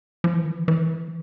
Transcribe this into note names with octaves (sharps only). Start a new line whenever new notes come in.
F3
E3
D#3
E3
E3